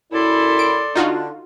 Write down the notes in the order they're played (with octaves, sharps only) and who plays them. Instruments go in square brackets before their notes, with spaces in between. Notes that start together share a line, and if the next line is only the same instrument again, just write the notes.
[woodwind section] F#2 E4 [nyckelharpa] A4 C6 [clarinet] D5
[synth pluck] D7
[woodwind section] D3 D4 [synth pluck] D#4 F4 F#4